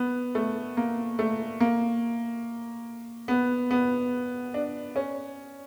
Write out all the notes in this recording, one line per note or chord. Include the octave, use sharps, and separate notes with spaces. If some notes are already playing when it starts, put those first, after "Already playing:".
Already playing: B3
A3
A#3
A3
A#3
B3
B3
D4
C#4